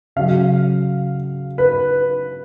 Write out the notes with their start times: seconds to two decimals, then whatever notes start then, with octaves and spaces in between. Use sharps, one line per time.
0.16 C#3 F#3 F5
1.58 B4